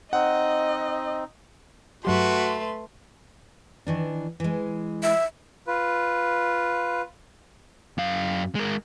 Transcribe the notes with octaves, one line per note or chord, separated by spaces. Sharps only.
C4 D#4 D#5 F#5
G2 F#3 A3 F#4 G4 B4 C6
D#3 E3 D4
E3 G#3
E5
F4 B4
F#2 F5
G#3 A#4